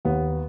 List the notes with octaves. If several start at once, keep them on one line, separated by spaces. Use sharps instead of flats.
D#2 B3